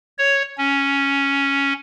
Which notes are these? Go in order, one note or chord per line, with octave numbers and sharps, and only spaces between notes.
C#5
C#4